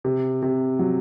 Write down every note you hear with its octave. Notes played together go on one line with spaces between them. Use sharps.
C3
C3
F#3